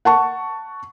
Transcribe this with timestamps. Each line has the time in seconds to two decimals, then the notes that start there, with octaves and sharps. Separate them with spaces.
0.05 F#5 A5 C#6